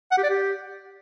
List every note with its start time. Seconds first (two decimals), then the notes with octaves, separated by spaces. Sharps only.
0.11 F#5
0.17 G4
0.23 D5
0.30 G4